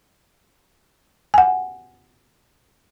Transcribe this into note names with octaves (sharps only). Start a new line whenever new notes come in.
F#5 G#5